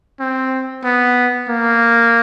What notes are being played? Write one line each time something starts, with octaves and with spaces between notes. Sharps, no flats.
C4
B3
A#3